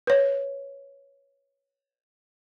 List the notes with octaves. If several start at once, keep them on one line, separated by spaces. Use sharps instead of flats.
B4 C#5